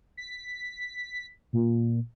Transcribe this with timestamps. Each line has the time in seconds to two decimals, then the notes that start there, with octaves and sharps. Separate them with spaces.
0.17 B6
1.53 A#2